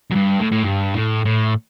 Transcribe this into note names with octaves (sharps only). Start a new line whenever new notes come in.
F#2
G2
A2
A2
G2
A2
A2